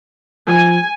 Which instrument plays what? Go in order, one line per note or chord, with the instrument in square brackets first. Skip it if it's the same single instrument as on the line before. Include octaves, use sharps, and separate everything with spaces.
[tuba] F3 [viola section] G#5